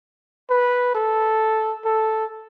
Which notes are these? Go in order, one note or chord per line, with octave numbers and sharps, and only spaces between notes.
B4
A4
A4